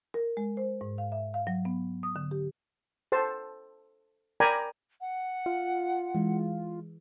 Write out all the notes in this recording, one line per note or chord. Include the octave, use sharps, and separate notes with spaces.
A#4
G#3
C5
G#2
F5
E5
F5
F#3
B3
D#6
D3
G4
A4 C5 A5
A#4 D5 G5 G#5 A#5 B5
F#5
F4
E3 G#3